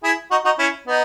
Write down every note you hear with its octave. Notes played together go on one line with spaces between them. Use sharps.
E4 G#4
D#4 F#4
D#4 F#4
C#4 E4
B3 D#4